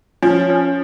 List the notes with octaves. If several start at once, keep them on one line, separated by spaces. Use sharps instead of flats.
F3 C#4
C#4